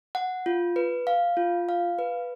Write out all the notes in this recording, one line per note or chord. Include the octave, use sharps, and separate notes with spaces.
F#5
F4
B4
F5
F4
F5
B4